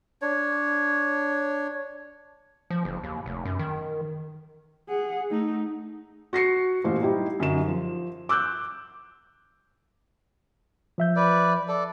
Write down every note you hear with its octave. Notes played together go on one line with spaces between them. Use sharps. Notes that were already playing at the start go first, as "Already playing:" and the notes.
D4 C#5
F3
F#1
D#2
F1
F#2
D#3
G#4 F#5
A3 D#4
F#4 A#6 C7 C#7
A1 A#2 C5
G3 D#4 E4 G4
F#2 D3 D#4 E7
F3
D6 E6 F#6 G6
F3 E5 G6
B4 D5
A4 D5